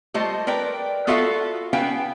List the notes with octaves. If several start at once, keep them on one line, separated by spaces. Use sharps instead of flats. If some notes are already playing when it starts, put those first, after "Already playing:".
G3 A3 F4 C5 D#5
A#4 B4 D5 G5
B3 F4 F#4 A4 E5 F5
B3 C#4 E4 B4 F5 G5